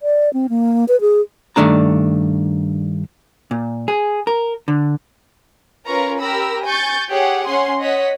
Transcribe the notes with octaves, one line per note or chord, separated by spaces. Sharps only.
D5
C4
A#3
B4
G#4
G2 D#3 A3 D4 A#5
A#2
G#4
A#4
D3
C#4 F4 A#4 B4 A#5 C#6
G4 A#4 B5 E6 A#6
G#5 C#6 G6 A6
G4 G#4 C#5 F#5
C#4 F#5 G#5 C6
C#5 D#5 F#5 B6